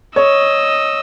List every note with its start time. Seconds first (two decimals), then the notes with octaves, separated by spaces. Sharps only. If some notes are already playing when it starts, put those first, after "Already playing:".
0.16 C#5 D#5 E6